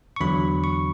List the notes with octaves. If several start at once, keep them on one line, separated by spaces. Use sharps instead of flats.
C#6
E2 D3 F#3 B5
C#6